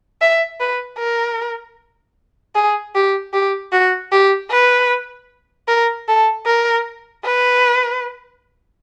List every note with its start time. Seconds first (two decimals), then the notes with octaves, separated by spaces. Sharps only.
0.22 E5
0.60 B4
0.99 A#4
2.55 G#4
2.95 G4
3.33 G4
3.72 F#4
4.12 G4
4.51 B4
5.68 A#4
6.08 A4
6.46 A#4
7.25 B4